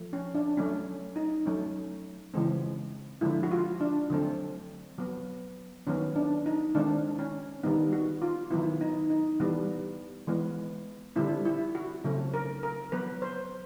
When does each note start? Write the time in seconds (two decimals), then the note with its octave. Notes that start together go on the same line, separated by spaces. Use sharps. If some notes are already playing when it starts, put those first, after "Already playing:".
Already playing: F3 A3
0.13 C#4
0.35 D4
0.57 F#3 A3 C#4
1.16 D#4
1.46 F#3 A3 C#4
2.34 C#3 E3 G#3 C4
3.21 D3 F3 G#3 E4
3.43 F#4
3.51 F4
3.80 D4
4.10 D3 F#3 A3 C4
4.98 F#3 B3
5.87 D#3 F#3 B3 C#4
6.16 D4
6.46 D#4
6.75 D#3 G#3 C4 D4
7.19 C#4
7.63 D#3 G3 B3 D#4
7.93 F#4
8.22 F4
8.51 D#3 F#3 B3 E4
8.81 D#4
9.10 D#4
9.40 E3 G3 B3
10.27 E3 G#3 B3
11.16 D3 G3 C4 E4
11.45 E4
11.75 F#4
12.04 C#3 F#3 A3 C4
12.34 A#4
12.63 A#4
12.92 F#3 B3 B4
13.22 C5